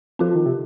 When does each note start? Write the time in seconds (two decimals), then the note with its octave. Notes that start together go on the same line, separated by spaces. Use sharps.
0.19 F3 C4 F4 A4
0.35 D#3
0.46 C3